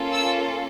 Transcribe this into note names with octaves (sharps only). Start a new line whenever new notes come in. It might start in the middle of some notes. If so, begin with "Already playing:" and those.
Already playing: A#3 C#4 F4 A4
E6